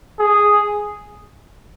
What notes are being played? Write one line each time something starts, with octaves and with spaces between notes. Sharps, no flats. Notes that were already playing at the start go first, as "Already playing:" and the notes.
G#4